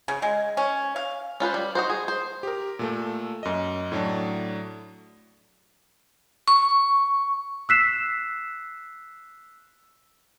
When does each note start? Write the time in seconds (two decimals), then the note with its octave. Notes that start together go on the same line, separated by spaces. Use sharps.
0.08 C#3
0.22 G#3
0.57 C#4
0.96 F5
1.40 C#4 F4 B4 C5
1.54 G3
1.75 D#4 F#4 C5
1.90 G#4
2.08 C5
2.43 G4 A#4
2.79 A#2 A3 A4
3.43 F#2 D#5
3.92 A2 F#3 A3 D4
6.48 C#6
7.69 E6 F#6 B6 C7 E7